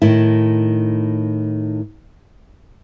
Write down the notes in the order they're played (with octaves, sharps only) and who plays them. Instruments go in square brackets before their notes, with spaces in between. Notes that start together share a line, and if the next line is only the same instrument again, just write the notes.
[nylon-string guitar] A2 D#3 E4